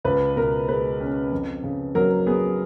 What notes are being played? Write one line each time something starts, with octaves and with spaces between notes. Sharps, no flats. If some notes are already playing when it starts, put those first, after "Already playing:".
C#2 B4
B2 A#4
G#3 B4
C#4
F2
C#3
F#3 A#4
B3 G#4